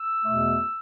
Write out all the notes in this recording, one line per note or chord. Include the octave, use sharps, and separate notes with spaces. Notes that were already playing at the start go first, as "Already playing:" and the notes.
Already playing: E6
E2 B2 A3